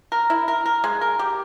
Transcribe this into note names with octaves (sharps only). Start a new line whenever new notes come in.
A#4
E4
A#4
A#4
G#3
A#4
G4